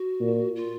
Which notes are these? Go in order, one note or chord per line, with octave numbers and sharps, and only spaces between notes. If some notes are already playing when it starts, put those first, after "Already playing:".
Already playing: F#4
A#2
F4